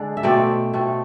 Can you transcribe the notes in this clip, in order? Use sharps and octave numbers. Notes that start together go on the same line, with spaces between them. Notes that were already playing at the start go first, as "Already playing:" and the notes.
Already playing: D3 G#3 D4
E5
B2 A3 C4 D5
B2 A3 C4